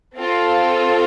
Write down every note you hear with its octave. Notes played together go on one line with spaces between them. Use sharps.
C4 F4 A4